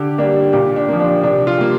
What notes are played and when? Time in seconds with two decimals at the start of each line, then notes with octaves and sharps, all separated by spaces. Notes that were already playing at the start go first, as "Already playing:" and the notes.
Already playing: D3 G4
0.18 G3 A#3 D4
0.53 A#2 G4
0.76 D4
0.89 F3 A#3
1.00 D4
1.23 C3 D4
1.47 F4
1.58 G3 A#3